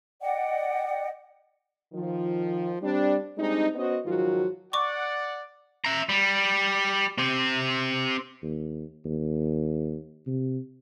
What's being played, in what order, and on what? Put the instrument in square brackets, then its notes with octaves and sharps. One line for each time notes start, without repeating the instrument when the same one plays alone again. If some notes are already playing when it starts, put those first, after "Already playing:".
[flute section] D5 D#5 F#5 G5
[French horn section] D#3 F3
G3 C4 D4
G3 G#3 C4 D4 D#4
B3 C#4 F#4 C5 D#5
G#2 D#3 F3 F#3 F4 F#4
[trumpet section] D5 F#5 [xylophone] C#6 D6
[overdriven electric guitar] E5 A#5
G3
C4 G4
[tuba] D#2
D#2
C3